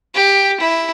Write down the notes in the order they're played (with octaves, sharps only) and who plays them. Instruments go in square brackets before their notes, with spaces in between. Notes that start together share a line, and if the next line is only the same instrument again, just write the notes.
[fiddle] G4
E4